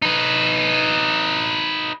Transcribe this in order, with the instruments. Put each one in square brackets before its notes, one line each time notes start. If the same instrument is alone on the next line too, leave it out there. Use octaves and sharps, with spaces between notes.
[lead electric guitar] D#4 B4